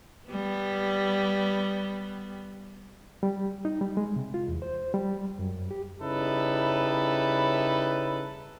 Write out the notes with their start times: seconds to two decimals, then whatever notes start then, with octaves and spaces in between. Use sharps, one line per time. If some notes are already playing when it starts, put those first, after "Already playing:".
0.29 G3 B3
3.23 G3
3.65 D#4
3.81 G3
3.97 G#3
4.16 C3
4.34 F4
4.48 E2
4.62 C5
4.94 G3
5.39 F#2
5.71 G4
6.02 C#3 G3 D#4 E4 A4 B4